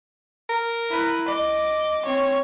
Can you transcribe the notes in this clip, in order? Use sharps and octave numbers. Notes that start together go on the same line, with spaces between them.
A#4
E4 B4
D#5 D6
C4 C#5